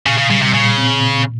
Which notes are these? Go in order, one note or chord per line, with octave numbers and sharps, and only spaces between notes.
A#2 C#3
C#3
C#3 G3
C3
A#2 C#3
C4
A#2